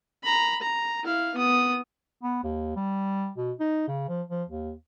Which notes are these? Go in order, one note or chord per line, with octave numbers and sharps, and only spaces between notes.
A#5 B5
A#5
E4 F5
B3 D#6
B3
D#2
G3
B2
D#4
C#3
F3
F3
D#2